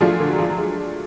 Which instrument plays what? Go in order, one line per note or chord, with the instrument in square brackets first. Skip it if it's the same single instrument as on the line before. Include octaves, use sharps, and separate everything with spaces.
[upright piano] F3 [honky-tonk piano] F#3 A3 D4 F4 G#4
[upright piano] D3
F#3
F3
F#3
G#3